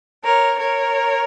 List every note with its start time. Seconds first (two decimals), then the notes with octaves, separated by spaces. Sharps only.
0.24 A#4 C#5
0.58 A#4 C#5